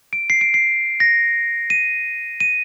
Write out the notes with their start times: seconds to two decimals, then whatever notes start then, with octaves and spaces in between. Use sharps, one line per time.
0.13 D7
0.30 C7
0.41 D7
0.54 C7
1.00 A#6
1.70 D#7
2.40 D#7